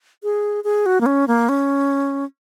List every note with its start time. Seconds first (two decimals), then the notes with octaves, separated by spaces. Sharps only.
0.23 G#4
0.64 G#4
0.86 F#4
1.01 A#3
1.06 C#4
1.28 A#3
1.49 C#4